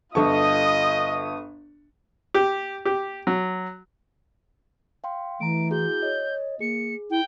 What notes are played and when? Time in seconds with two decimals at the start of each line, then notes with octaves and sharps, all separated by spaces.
0.15 G1 F4 A4 D#5 C#6 D#6
2.34 G4
2.85 G4
3.27 F#3
5.04 F5 G5 C6
5.40 E3 A3 A#5 D7
5.71 E4 F#4 G#4 G6
6.02 C#5 D#5
6.61 A#3 G#4 C#7
7.10 E4 G5